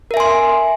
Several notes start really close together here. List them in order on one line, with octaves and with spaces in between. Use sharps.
A#4 E5 G#5 C6